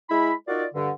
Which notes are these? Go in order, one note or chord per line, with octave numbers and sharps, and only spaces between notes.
G#3 E4 B5
D#4 F4 F#4 A#4 D5
G2 D3